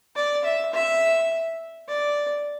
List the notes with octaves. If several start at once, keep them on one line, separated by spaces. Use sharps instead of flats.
D5
E5
E5
D5